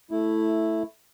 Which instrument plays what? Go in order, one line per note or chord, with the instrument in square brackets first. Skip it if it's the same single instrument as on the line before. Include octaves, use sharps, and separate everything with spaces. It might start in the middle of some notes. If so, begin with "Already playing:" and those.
[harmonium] A3 E4